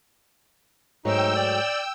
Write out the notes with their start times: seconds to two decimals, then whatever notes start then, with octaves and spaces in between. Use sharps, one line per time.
1.05 G#2 F#3 A3 D#4 G5 E6
1.36 D5